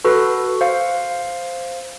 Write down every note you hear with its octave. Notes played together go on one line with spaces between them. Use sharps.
F#4 A4 B4
C5 F5